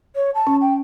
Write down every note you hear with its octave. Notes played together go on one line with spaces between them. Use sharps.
C#5
A5
C#4
G5